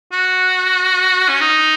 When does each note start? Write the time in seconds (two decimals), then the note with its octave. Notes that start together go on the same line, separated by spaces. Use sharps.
0.12 F#4
1.28 C#4
1.41 D#4